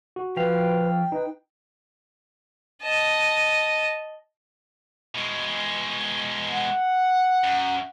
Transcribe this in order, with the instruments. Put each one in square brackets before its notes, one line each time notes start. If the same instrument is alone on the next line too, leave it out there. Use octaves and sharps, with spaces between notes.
[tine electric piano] F#4
[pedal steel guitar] F3 F5 [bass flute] B4 [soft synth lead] G5
[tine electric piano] D#4 [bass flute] B4
[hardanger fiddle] D#5 A5
[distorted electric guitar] B2 G#3
[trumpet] F#5
[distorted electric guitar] F#2